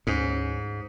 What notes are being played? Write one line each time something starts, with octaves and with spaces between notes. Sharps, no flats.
D2 G#2 C#4